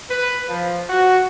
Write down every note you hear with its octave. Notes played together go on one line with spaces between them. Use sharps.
B4
F3
F#4